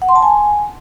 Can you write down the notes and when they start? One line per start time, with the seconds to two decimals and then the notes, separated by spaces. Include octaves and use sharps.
0.02 F#5
0.09 C6
0.16 A5
0.23 G#5